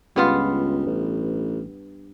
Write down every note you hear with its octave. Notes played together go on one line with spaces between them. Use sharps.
C#2 G2 B3 F4
A1